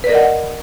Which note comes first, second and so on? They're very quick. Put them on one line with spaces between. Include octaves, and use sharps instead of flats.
B4 D5 A#4 D#5 F#5